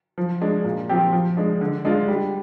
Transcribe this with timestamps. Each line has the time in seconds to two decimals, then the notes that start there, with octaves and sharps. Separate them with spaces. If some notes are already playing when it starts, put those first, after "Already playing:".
0.18 F3
0.41 G#3 D4
0.64 A#2
0.89 F3 C4 G4
1.12 F3
1.37 G#3 D4
1.61 D3
1.85 G#3 D4 F4
2.08 G3